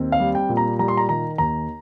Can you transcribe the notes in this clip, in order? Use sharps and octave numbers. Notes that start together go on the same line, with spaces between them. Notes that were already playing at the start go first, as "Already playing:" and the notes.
Already playing: D#2 C4
F5
G3
G5
A#2
A#5
G3 A#5
C6
A#5
D#3 A#5
D#2 A#5